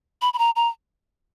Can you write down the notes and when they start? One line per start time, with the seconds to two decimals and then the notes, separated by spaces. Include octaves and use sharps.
0.22 B5
0.34 B5
0.39 A#5
0.56 A#5